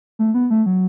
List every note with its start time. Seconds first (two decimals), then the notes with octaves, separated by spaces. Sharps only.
0.19 A3
0.34 B3
0.50 A3
0.66 F#3